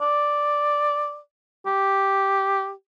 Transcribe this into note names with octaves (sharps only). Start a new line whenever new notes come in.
D5
G4